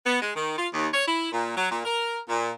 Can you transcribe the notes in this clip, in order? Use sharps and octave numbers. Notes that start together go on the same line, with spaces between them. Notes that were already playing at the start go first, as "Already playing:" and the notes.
B3
G#3
D#3
F4
D#2
C#5
E4
A#2
F#3
A#2
A#4
A#2